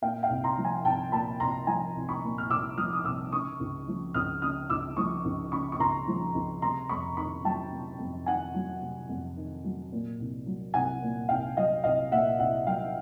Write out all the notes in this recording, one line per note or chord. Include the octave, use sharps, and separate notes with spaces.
A#2 F5 G5
F5 G5
C2
A#5 C6
F3
G#5 A#5
C2 G5 A5
A#2 A5 B5
C2 A#5 C6
F3 G#5 A#5
C2
B5 C#6
A#2
F6
C2 D6 E6
F3 D#6 F6
D#6
C2 D6 E6
C#3 C#6 D#6
C#2
F3
C#2 D#6 F6
C#3 D#6 F6
C#2 D6 E6
F3 C#6 D#6
C#2
C#3 B5 C#6
C#6
C#2 A#5 C6
F3
C#2
C3 A#5 C6
F2 B5 C#6
D#3 B5 C#6
F#3 G5 A5
C3
F2
D#3 F#5 G#5
F#3
C3
F2
D#3
F#3
A#2
C2
F#3
C2 F#5 G#5
A#2
C2 F5 G5
F#3 D#5 F5
C2 D#5 F5
A#2 E5 F#5
C2 E5 F#5
F#3 F5 G5